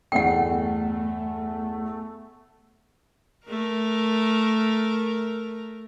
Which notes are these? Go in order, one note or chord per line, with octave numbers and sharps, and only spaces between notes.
G1 E2 A3 F#5 G5
A3 A#4